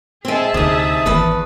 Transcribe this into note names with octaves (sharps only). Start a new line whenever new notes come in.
G#3 C4 G#4 E5 A5
D2 C3 D#4 D#6
G#1 E2 C3 E3 B4 A5